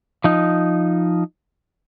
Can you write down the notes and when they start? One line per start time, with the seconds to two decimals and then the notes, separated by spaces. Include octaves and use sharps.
0.24 F3 D#4